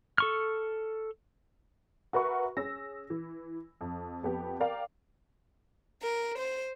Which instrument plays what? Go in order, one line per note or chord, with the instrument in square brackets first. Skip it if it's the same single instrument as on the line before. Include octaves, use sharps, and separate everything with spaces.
[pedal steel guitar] A4 C#6 F6
[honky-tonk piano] F#4 A#4 B4 E5 C#6
C#4 G#4 E6 A#6
E3
F2
F2 B3 G4
A#4 D5 F5 G5 D6
[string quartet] A#4
C5